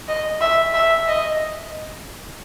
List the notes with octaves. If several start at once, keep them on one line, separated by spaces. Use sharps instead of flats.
D#5
E5
E5
D#5